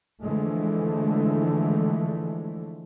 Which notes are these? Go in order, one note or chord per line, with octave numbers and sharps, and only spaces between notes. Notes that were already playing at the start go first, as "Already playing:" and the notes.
D3 E3 F3 G#3 A3